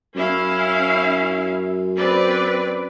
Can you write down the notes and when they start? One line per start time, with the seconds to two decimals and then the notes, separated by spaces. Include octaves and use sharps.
0.15 F#2 C#4 E4 F5
1.97 C4 B4 D5